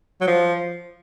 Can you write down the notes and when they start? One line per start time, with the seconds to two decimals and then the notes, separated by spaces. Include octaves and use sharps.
0.21 F#3
0.27 F3